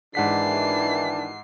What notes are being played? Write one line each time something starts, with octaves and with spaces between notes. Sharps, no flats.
G#2 D#3 E3 D4 F#5 B6 C7